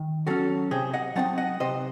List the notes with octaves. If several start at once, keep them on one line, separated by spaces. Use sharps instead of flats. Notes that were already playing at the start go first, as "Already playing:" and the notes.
Already playing: D#3
F#3 C#4 F#4 A4
C3 G#4 C5
D#5 F#5
F#3 C4 D#4 F#5 A5
D#5 F#5
C3 C5 D#5